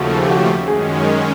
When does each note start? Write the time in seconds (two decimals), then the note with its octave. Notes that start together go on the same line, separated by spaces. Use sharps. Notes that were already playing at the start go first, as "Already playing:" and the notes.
Already playing: D#2 C#3 F3 A3 F#4
0.22 G4
0.30 F#4
0.37 G4
0.67 F#2 D#3 G#3 C#4 G#4